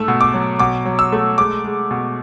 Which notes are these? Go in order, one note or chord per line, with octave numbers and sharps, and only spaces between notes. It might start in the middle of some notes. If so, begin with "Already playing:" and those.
Already playing: G#2 A3 E6
B2
D6
F#3
B2 D6
F#3
E6
A3
G#3 D6
G#3
B2